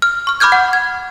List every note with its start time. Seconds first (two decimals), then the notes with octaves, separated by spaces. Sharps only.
0.02 F6
0.27 C#6 F6
0.40 B5 D6 F6 G6 G#6
0.52 F#5
0.73 G#6